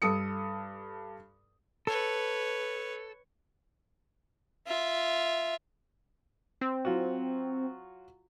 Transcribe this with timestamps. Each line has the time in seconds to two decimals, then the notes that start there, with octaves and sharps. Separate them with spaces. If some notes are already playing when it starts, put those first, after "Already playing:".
0.02 G2 A4 D#6 C#7
1.87 A4 B4 C#5
4.67 F4 E5
6.61 C4
6.85 F#3 F4 F#4